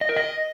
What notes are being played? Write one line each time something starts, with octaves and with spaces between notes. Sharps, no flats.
D#5
A#4
D#5